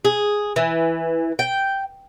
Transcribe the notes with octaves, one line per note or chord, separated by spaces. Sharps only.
G#4
E3
G5